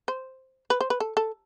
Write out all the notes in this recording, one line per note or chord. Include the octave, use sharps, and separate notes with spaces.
C5
B4
C5
B4
A4
A4